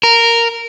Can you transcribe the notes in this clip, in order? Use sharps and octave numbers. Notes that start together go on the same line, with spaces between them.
A#4